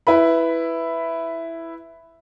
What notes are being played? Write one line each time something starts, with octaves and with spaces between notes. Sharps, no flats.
E4 B4 B5